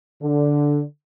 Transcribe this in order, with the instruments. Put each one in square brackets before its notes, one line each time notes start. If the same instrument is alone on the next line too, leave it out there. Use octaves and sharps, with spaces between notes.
[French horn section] D3